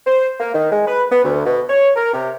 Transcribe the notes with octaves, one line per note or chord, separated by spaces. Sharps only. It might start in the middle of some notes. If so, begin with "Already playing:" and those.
C5
A#3
D#3
G#3
B4
B3
D2
B2
C#5
A#4
C3